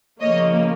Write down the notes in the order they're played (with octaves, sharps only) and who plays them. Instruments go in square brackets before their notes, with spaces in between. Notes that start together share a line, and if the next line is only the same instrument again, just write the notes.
[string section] C#3 F3 A#3 C#5 D#5